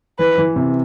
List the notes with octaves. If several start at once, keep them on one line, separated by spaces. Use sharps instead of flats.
E3 B4
E3
C3